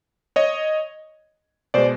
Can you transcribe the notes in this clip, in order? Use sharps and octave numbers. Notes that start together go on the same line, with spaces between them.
C#5 D#5
B2 G#3 C5 D5